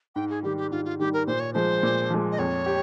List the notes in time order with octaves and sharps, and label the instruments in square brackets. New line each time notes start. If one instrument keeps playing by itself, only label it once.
[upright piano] G#2 [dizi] G5
[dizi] G#4
[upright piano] D#3 G3 [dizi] G4
[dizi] G4
[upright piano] G#2 [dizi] F4
[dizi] F4
[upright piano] D#3 G3 [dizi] G4
[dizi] A#4
[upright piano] A#2 [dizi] C5
[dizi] C#5
[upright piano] F3 G#3 [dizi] C5
[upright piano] A#2
F3 G#3
[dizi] D#5
[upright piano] F2 [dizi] C#5
[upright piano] G4